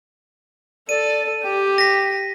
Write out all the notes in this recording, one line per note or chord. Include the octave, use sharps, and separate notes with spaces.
A4 D5 D#7
G4 G5
A#6 B6